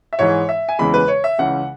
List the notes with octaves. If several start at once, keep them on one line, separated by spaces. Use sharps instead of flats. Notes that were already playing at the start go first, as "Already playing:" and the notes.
E5
G#2 E3 G#3 C#5
E5
G#5
E2 C#3 E3 G#3 B5
B4
C#5
E5
C#2 C#3 E3 F#5